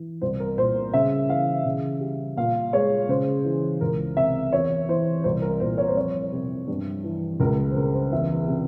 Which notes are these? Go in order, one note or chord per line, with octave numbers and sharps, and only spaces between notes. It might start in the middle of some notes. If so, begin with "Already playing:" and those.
Already playing: E3
C2 C5
A#4
A#2 C5
C#3 E5
E3 F5
C#3
G3
A#2 F5
G#3 C#5
C#3 C5
E3
C#2 A#4
C3 E5
E2 C#5
E3 C5
C2 C5
A#4
A#2 C5
C#5
C5
F2 C#5
C3
G2
E3
C#2 A#4
C5
C#3 A#4
C5
E2 E5
C3